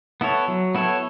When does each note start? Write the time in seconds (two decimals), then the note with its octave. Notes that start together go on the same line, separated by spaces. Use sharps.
0.21 B3 E4 A4 C#5
0.48 F#3
0.75 B3 E4 A4 C#5